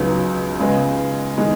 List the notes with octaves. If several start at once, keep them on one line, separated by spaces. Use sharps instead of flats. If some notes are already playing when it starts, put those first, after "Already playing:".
Already playing: C#2 C#3 F#3 B3 D#4
C#3 G#3 B3
D#3 G#3